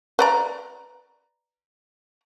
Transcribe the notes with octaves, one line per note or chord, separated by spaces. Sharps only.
B4 D5 A#5